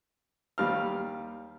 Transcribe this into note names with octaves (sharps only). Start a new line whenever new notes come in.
D#2 G3 F5 F6